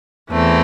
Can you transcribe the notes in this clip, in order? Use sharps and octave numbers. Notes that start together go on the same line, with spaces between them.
E2 E3 A3 C4